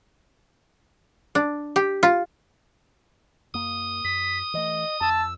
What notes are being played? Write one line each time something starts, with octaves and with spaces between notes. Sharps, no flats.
D4
G4
F4
F#2 A#3 D#6
F#2 B6
E3 A3 D#5
F2 A5 E6